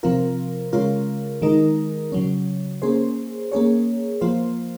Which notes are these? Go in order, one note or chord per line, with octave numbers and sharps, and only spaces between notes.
C3 F3 C4 F4 A#4
C#3 G#3 C#4 F4 A#4
D#3 G#3 D#4 A#4
C#3 F#3 C#4
A#3 C#4 G#4 C5
A#3 C#4 G#4 C#5
F3 A#3 F4 C5